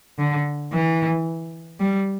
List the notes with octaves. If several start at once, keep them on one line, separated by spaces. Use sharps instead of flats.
D3
E3
G3